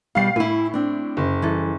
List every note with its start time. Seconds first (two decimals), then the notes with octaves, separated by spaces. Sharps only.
0.15 B2 G3 F5 C7
0.36 A2 E4 G#5
0.74 C4 D4
1.17 F#1
1.42 E3 G3 A4